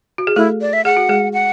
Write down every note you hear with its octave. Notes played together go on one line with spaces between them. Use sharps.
F#4
G#4
A3 E4 A4
D5
E5
G#4 F#5
F#4
G#3 G#4
F#5